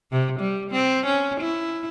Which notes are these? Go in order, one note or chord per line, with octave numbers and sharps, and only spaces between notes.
C3
G3
C4
C#4
E4